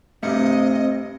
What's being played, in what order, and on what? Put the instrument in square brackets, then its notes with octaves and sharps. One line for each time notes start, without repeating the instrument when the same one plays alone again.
[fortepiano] G2 C3 [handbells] A3 C#7 [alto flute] C4 [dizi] D#5